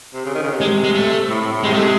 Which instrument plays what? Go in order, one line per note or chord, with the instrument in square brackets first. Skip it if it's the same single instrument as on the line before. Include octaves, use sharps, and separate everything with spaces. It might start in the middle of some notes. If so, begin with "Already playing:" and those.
[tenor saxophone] C3
C#3
D#3
C#3
C3
[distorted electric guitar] G#3
G#3
A3
[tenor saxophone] A2
A2
A2
[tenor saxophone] C3 [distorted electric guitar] G#3
[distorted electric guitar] A3
G#3